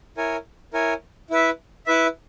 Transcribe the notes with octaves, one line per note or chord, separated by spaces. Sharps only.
E4 A#4 C#5 G#5
E4 A#4 C#5 G#5
E4 B4 E5
E4 B4 E5